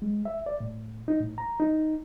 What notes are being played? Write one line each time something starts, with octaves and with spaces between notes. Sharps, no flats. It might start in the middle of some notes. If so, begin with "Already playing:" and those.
G#3
E5
D5
A2
D#4
A2
A#5
D#4